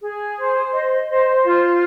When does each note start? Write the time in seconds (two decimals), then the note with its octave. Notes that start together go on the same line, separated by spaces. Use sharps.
0.02 G#4
0.37 C5
0.72 D#5
1.09 C5
1.44 F4